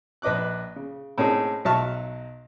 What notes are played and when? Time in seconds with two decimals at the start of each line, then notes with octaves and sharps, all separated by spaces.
0.22 A#1 B4 D#5 D6 F#6
0.76 C#3
1.18 A2 A#3 C4 C#4 D#4 G#4
1.65 B1 F#3 E5 A5 C#6 F6